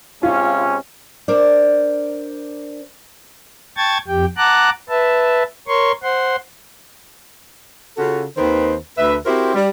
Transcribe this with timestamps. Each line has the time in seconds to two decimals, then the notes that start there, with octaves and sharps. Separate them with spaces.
0.23 C3 G#3 C#4 F4
1.28 D4 A#4 C5 D5
3.77 G5 A5 C#6 G#6 A6
4.08 F2 G4 G5
4.37 F#5 A5 A#5 D6 F#6
4.89 B4 E5 A5
5.68 A#4 C#5 C6 C#6
6.03 C5 F#5 C6
7.97 C#3 C#4 F4 F#4 A4
8.37 D#2 D#3 C4 B4 C5
8.98 D2 B4 E5
9.26 C4 E4 F#4 G4 A#4 C5
9.55 G3